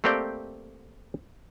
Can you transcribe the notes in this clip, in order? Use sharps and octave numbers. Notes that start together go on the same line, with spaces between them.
A3 A#3 C4 G4 D5 G5